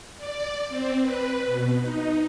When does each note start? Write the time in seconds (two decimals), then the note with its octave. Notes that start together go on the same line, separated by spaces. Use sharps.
0.17 D5
0.69 C4
1.01 B4
1.46 B2
1.81 D#4